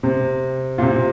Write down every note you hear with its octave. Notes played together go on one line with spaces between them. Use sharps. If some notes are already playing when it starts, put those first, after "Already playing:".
C3
A#2
C3